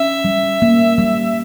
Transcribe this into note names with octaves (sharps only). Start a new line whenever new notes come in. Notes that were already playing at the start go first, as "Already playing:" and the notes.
Already playing: C#4 E5
G3
A#3
G3